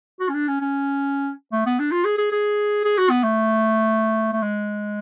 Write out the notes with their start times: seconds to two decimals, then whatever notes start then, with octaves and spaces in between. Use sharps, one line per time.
0.20 F#4
0.29 C#4
0.34 D4
0.48 C#4
0.61 C#4
1.52 A3
1.66 B3
1.79 D4
1.91 F4
2.05 G#4
2.18 G#4
2.32 G#4
2.84 G#4
2.98 F#4
3.10 B3
3.23 A3
4.33 A3
4.43 G#3